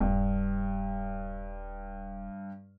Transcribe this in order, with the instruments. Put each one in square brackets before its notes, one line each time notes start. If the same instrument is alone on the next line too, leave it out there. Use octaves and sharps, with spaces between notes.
[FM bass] D#1 [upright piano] G2